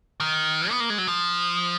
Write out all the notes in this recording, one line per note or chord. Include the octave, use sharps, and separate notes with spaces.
D#3
B3
A#3
G#3
F#3
F3